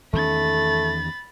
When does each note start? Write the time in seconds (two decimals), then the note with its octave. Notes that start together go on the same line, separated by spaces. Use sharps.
0.13 E2 D#3 A3 C#4 B5 A6